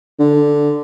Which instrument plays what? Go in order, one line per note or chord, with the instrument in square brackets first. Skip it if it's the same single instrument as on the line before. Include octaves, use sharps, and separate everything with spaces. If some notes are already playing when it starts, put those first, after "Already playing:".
[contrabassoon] D3